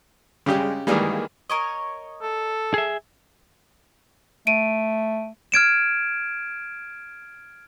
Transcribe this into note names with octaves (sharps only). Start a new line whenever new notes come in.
C#3 G3 G#3 G4
D#3 E3 G3 G#3 A#3 G#4
A#4 C#5 D#5
A4
G#4 E5
A3 D7 D#7
F6 G#6 D7 E7